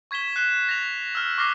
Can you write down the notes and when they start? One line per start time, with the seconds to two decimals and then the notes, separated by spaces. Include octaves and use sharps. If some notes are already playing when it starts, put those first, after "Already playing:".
0.11 C#6 G#6 B6 E7 G7
0.36 F#6 C7 E7 G7
0.69 A#6 F7
1.15 E6 F6
1.38 C#6 D6 F6 A#6 C7